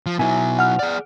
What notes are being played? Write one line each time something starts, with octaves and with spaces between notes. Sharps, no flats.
F3
B2 F#3 E4 E5 G#5
F#5 F6
G#4 D5